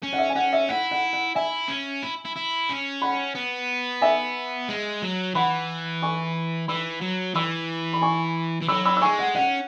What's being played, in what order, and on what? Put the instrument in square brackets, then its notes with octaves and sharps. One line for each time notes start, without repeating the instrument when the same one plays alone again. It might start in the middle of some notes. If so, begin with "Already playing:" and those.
[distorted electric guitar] C#4
[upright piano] F#5
E5
G#5
[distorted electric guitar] C#4 [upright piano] F#5
[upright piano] E5
[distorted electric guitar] E4 [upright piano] F#5
[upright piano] F#5
F#5
[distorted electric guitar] E4 [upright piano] E5 G#5
[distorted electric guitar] C#4
E4
E4
E4
C#4
[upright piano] F#5 B5
[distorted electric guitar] B3
[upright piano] E5 G#5
[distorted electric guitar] G#3
F#3
[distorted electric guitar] E3 [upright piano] F#5 B5
[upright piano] G#5 C#6
[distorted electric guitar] E3 [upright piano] B5 E6
[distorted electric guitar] F#3
[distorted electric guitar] E3 [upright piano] B5 E6
[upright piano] B5
G#5 C#6
[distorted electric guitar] E3
[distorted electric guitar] F#3 [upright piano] B5 E6
[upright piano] B5 E6
E6
[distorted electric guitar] G#3 [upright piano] G#5 C#6
[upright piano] F#5
[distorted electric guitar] C#4 [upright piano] F#5